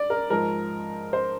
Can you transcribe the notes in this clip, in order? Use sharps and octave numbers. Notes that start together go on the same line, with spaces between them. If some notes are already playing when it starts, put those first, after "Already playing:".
Already playing: D5
A#4
G#2 F3 A#4
C5